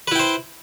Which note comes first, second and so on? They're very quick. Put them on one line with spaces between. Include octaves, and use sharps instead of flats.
B4 E4 G5 C5